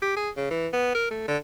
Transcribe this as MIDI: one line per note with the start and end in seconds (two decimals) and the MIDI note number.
0.02 0.13 67
0.16 0.30 68
0.37 0.50 49
0.50 0.68 52
0.73 0.93 59
0.95 1.06 70
1.10 1.28 57
1.28 1.37 50